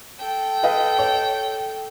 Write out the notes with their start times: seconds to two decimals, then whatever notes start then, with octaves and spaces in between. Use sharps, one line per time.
0.19 A4 G5
0.63 B4 D#5 F5
0.99 C#5